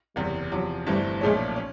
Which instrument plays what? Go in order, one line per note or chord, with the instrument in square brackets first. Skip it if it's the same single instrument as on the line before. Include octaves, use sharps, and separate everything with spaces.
[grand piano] F#1 E2 C3 [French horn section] G3
[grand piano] E2 C3 F3 [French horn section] F#3
[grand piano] G1 G2 E3 A3 C4 [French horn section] G3
[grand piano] B1 A#2 F3 A3 C#4 [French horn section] G#3
[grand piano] C#4